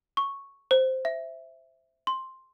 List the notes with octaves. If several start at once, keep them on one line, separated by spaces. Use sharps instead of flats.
C#6
C5
E5
C6